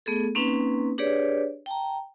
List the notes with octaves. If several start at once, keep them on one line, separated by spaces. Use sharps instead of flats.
A3 B3 G#4 A4
A#3 C4 C#4 D#4 B4
D4 G4 G#4 B4 C#5 D5
G5 A5 A#5